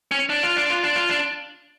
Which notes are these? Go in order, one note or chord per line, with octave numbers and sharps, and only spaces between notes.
C#4
D4
F4
D4
F4
D4
F4
D4